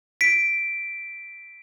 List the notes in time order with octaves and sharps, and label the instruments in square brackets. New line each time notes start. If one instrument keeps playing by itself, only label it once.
[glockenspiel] B6 D7